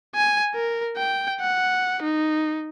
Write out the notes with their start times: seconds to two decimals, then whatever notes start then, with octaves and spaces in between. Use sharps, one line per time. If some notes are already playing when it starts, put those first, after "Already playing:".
0.15 G#5
0.55 A#4
0.97 G5
1.41 F#5
2.03 D#4